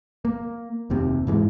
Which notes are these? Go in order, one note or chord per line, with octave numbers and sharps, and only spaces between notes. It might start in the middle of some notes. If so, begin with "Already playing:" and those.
A#3
F1 D#2 C3
G#2 E3 G#3